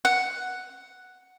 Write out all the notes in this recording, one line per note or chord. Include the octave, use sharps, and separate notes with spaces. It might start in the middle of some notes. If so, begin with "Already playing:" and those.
F#5